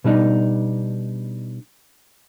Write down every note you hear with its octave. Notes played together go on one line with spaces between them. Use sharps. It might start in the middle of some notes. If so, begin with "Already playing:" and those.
B2 G3 D4 D#4